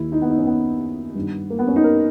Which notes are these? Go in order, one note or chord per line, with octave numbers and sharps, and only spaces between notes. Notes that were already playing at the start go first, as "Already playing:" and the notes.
Already playing: D#2 D#3 E4
D#4
B3
D#4
C#4
B3
G2 D#3
A#3
B3
C#4
D#4
A#4